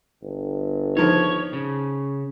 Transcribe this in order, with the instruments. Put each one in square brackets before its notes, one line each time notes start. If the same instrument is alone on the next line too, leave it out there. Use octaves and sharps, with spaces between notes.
[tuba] G1
[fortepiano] D#3 F3 [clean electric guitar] C#5
[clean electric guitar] C#3